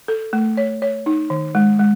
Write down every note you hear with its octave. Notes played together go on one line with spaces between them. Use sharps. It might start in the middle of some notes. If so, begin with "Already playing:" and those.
A4
A3
C#5
C#5
D#4
D#3
G#3
G#3